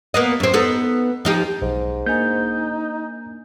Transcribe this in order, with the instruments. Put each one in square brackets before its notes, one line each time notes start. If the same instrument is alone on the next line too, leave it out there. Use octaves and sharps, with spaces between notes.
[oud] A#3 B3 D#5
F#2 C4
B3 D#4 A4
F3 D#4 G4
[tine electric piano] B1 [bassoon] G#2
[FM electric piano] A#3 D4 G#5 [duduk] D#4 [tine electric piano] G6